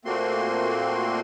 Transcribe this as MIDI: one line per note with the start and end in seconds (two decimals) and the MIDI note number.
0.05 1.20 46
0.05 1.20 57
0.05 1.20 58
0.05 1.20 60
0.05 1.20 66
0.05 1.20 84